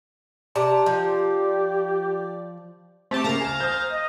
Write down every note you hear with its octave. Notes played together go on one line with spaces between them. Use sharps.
C3 D5 A5 A#5 D6
F3 G4
A3 C4 G4 A5
C#3 A#3 F5 A#5 A6
G#5 E7
C5 D#6 G6
D#5